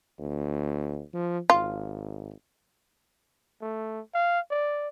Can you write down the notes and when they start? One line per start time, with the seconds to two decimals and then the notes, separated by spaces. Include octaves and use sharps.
0.19 D2
1.13 F3
1.50 G#1 F4
3.62 A3
4.15 F5
4.51 D5